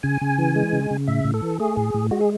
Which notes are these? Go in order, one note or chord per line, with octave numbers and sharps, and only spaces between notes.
C#3 G#5
C#3
E3
G#3
C#3
C#3
A2 E5
A2
A4
E3
A3 G#4
A2
A2
G#3 F#4
G#4